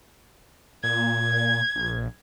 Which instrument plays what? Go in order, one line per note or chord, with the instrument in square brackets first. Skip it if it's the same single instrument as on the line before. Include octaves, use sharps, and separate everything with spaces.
[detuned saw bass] A#2 [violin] G#6
[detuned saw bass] A#1